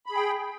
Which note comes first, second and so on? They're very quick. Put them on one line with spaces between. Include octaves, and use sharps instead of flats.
B5 G#4 G5